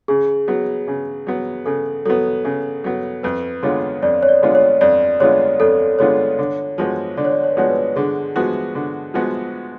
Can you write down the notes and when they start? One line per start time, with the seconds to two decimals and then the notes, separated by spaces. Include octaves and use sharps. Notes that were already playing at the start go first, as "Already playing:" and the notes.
0.08 C#3 G#4
0.48 F#3 B3
0.88 C#3
1.27 F#3 B3
1.66 C#3 A4
2.06 F#3 B3 A4
2.45 C#3
2.84 F#3 B3
3.23 F2 B4
3.63 D3 G#3 B3 F4 C#5
4.02 F2 D5
4.23 C#5
4.29 D5
4.42 D3 G#3 B3 F4
4.55 C#5
4.81 F2 D5
5.20 D3 G#3 B3 F4 C#5
5.60 F2 A4
5.99 D3 G#3 B3 F4 C#5
6.39 D3
6.78 F3 G#3 B3 F#4
7.17 D3 D5
7.25 C#5
7.32 D5
7.43 C#5
7.52 B4
7.57 F3 G#3 B3 F#4 C#5
7.70 B4
7.96 D3 G#4
8.36 F3 G#3 B3 F#4
8.75 D3
9.14 F3 G#3 B3 F#4